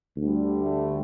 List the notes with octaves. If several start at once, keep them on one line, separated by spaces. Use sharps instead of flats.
D2 D3 G3
A3